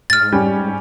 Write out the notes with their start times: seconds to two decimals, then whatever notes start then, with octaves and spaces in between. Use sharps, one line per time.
0.10 G#2 F6 A6
0.32 G3 C#4